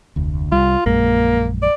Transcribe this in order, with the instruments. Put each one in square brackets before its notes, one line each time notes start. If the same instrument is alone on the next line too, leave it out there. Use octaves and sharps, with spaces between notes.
[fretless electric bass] F1 D2
[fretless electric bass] C2 G3 [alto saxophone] F4
[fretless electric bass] A#1 F#2 G#3 [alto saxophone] A#3
[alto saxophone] D5